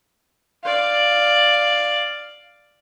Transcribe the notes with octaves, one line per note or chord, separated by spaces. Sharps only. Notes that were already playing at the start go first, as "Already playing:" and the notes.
D5 F5